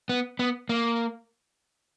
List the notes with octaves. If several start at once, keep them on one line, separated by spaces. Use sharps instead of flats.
B3
B3
A#3